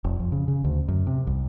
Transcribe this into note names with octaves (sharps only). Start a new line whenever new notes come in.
F1
F2
C#3
C#3
D2
F#2
C3
C2